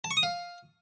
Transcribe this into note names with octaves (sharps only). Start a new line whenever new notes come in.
A5
C#6
D#6
F5